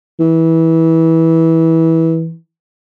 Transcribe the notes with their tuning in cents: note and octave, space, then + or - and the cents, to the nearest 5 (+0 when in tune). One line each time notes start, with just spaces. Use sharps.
E3 -20